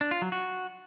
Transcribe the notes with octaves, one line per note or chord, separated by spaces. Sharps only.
D4
F4
F#3
F#4